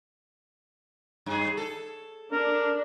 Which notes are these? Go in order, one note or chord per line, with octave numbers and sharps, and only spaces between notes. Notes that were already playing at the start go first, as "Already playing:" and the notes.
G2 G#4
A4
D4 A#4